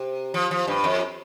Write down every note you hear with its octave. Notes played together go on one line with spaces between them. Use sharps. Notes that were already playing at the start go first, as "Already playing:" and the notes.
Already playing: C3
F3
F3
G2
F2